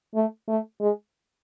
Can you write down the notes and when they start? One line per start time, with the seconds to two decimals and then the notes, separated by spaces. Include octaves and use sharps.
0.15 A3
0.48 A3
0.80 G#3